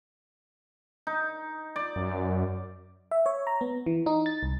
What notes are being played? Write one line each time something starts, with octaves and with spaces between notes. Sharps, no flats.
D#4
D5
F#2
E5
C#5
A#5
B3
E3
D#4
A6
C2